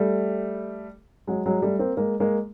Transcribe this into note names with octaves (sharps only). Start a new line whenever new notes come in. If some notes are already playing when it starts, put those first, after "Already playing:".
Already playing: G3 A3
F#3 G#3
F#3 G#3
G3 A3
A#3 C4
G#3 A#3
G#3 A#3